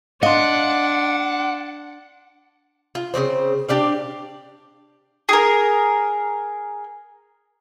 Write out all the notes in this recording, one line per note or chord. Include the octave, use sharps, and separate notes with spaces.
D4 D#5 F5 F#5 C6
F4
C#3 A#3 C4 C5
D4 G4 D5 F5
G#4 A#4